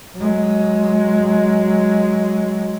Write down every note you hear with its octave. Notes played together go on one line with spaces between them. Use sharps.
F#3 G#3